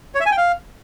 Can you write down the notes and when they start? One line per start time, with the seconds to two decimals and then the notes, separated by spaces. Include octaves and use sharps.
0.15 C#5
0.20 E5
0.26 G#5
0.32 G5
0.37 F5